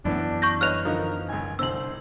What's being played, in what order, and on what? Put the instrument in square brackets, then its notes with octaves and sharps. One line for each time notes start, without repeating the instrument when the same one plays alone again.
[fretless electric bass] F#2 E3 B3 [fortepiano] A2 [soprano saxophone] D4
[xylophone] C#6 G6 A#6
[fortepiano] B4 C#5 D#5 [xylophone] F6 F#6 F7
[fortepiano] D3 F3 D#4 [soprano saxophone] A#4
[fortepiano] G#1 C#2 [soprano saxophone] G#5
[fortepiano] C2 D3 [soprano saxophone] C5 [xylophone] E6 F#7